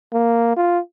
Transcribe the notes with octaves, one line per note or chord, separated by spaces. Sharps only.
A#3
F4